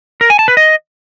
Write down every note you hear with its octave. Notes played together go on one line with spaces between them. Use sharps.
A#4
G#5
A5
B4
D#5